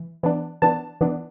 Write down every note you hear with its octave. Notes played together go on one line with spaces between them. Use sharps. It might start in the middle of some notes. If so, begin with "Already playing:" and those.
Already playing: E3
E3 B3 D4
E3 B3 D4 A5
E3 B3 D4